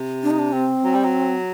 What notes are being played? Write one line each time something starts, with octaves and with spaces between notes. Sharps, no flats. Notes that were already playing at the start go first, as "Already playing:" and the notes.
Already playing: C3
D4
D#4
D4
C4
F#3
G3
F#3